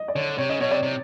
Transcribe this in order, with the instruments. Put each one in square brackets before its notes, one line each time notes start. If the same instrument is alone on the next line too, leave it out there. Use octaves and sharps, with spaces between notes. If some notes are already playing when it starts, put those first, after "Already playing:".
Already playing: [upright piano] D#5
D5
[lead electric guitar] D3 [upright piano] C#5
[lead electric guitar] C3 [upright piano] C#5
[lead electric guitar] C#3 [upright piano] D#5
[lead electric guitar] B2 [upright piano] C#5
[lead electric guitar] C3 [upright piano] D5
[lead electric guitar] C3